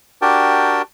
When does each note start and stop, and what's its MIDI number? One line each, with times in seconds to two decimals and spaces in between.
0.22 0.82 62
0.22 0.82 66
0.22 0.82 67
0.22 0.82 70
0.22 0.82 79
0.22 0.82 81